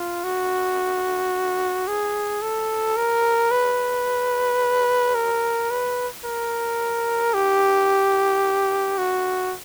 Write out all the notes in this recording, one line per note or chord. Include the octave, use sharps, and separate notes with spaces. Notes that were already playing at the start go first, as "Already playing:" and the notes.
Already playing: F4
F#4
G#4
A4
A#4
B4
A#4
B4
A#4
G4
F#4